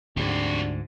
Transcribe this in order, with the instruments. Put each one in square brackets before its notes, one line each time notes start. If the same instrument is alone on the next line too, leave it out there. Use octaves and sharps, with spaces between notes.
[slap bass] D2 G#2 [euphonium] D4 [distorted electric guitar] F4 G4